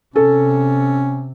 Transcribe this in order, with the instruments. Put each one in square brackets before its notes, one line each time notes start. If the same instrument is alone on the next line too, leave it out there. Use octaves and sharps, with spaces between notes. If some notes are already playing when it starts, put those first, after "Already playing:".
[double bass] C3 [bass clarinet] C#4 [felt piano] A4